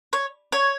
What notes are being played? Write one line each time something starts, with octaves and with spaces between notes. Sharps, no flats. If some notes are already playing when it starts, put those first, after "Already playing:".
C#5
C#5